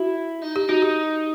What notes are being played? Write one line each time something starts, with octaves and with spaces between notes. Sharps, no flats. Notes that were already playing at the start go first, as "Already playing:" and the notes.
Already playing: E4 F#4
D#4
G4
D#4 F#4
G4